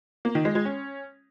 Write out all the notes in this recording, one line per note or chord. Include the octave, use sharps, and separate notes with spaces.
A#3
D#3
G#3
G#3
C#4